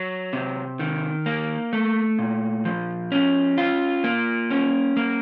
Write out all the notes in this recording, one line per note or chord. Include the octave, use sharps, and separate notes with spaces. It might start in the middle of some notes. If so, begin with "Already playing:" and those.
Already playing: F#3
C3
D#3
A#3
A3
A#2
F3
C#4
F4
A#3
C#4
A#3